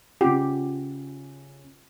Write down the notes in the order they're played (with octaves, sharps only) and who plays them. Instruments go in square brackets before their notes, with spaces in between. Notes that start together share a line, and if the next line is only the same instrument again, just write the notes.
[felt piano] C#3 C#4 [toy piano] F4 F#5 [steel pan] G4